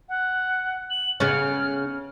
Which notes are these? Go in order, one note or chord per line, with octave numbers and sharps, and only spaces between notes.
F#5
F#7
C#3 B3 C#4 F6